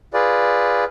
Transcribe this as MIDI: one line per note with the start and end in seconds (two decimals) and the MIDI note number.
0.14 0.84 65
0.14 0.84 68
0.14 0.84 71
0.14 0.84 74